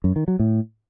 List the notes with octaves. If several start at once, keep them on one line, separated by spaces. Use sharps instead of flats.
F#2
D#3
F#3
A2